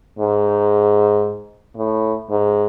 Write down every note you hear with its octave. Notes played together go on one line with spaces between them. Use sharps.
G#2
A2
G#2